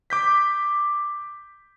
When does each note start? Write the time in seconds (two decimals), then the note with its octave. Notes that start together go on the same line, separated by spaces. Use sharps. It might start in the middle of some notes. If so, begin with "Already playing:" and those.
0.10 D6 G6 B6